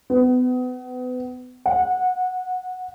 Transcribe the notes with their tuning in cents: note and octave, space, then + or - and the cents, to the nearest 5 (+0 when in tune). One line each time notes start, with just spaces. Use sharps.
B3 +35
F#5 -20